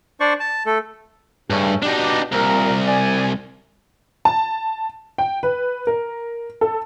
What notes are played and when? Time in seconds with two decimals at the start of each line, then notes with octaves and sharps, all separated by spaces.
0.20 D4 C5 D5 C#6
0.40 A5
0.66 A3 A4
1.50 G2 C#3 A3 C#4
1.83 B2 D4 D#4 G4 D5
2.32 C2 A#2 A#4
2.87 D5 G#5
4.25 A5
5.18 G5
5.43 B4
5.87 A#4
6.61 A4